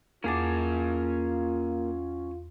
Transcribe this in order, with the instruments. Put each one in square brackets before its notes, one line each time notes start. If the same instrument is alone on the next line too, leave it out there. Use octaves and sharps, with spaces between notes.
[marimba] E2 D6 [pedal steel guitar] A#3 G#4 A5 [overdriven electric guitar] C#4 F#5 [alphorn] F4